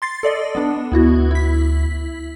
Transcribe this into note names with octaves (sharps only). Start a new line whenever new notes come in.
C6 A6 C7
A4 D5 D#5
B3 D4
D2 B3 E4 F#4
E4 B6